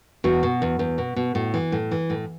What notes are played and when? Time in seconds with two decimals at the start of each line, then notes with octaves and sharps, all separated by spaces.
0.24 E2 F#4
0.43 B2
0.62 E2
0.79 E2
0.98 B2
1.16 B2
1.35 A2
1.54 E3
1.72 A2
1.91 E3
2.10 A2